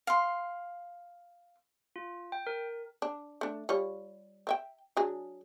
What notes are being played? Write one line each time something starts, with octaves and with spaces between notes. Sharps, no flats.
F5 C6
F4
G5
A#4
D4
A3 D4
G3 F4 C#5
C4 E5 G5
F#3 D4 G#4